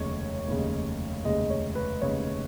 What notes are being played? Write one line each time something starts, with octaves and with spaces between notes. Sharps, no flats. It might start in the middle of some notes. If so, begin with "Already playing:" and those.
Already playing: F1 D#2 C#3 G#3 C#5
F1 D#2 C#3 G#3
F1 D#2 C#3 G#3 D#5
C#5
B4
F1 D#2 C#3 G#3 C#5